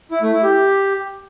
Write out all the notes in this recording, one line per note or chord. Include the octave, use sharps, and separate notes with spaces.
E4
A3
E4
G4